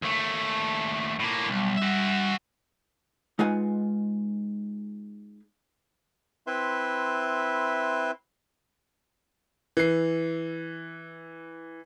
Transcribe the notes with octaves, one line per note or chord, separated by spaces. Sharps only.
D#2 A3
A2 A#3
B1 G3
F#4 E5
G#3 D#4 F4 B4 F#5 G#5
C4 E4 B4 E5 C6
E3 C7